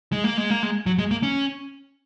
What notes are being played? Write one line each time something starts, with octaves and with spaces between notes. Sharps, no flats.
G#3
A#3
G#3
A#3
G#3
F#3
G#3
A#3
C#4